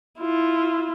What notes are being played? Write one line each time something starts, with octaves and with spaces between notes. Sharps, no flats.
E4 F4